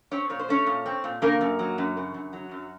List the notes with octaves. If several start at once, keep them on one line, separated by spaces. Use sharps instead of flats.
C4 C#4 C#5
A#2 C#5
C5
A3 C#4 C#5
A#2
C4
A#2
C#3 A#3 A#4
F#2
F#3
F#2
C#3
F#2
F#3
F#2